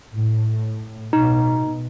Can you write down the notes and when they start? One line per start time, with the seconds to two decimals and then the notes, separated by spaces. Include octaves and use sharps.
0.13 A2
1.13 B2 D#4